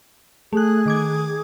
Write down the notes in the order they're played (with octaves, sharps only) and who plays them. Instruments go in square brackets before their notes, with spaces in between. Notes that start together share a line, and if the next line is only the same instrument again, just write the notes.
[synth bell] A3 F#6 [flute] G#4
[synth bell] D#3 D6 G#6